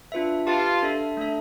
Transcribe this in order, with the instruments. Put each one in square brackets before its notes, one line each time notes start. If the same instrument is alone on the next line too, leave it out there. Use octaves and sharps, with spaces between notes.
[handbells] D4 F4 B4 E5
[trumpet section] F4 [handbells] G4 B4 F5 A5
[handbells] D4 A4 E5
A3 D4 A4 E5